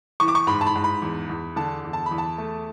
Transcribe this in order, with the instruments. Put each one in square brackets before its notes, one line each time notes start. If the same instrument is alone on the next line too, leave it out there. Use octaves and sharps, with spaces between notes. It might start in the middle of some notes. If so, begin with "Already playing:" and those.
[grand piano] E3 C#6
D6
C#6
G#2 B5
A5
B5
G#2
B5
E2
E2
D3 A5
E2
A5
B5
E2
A5
A3